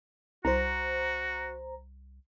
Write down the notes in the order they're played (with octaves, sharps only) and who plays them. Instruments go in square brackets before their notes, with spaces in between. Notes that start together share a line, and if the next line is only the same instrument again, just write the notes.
[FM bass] C2 [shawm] F#4 [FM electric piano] C5 A#5